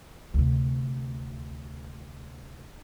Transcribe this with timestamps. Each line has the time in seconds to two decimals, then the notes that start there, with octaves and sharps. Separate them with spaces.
0.34 D2 C3